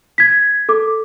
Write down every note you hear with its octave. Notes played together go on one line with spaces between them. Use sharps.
G#6 B6
A4 D6